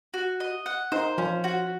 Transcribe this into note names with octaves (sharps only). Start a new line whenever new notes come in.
F#4
D#5
F#5
D#4 C5
F3 C#4
F#4